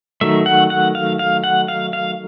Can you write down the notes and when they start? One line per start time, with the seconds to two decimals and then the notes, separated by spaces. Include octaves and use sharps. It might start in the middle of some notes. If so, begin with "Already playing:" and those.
0.21 D#3 F#3 A3 E5
0.46 F#5
0.70 F#5
0.95 F5
1.19 F5
1.44 F#5
1.68 F5
1.93 F5